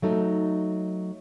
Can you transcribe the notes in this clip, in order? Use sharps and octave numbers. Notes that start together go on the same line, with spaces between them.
F#3 A3 D#4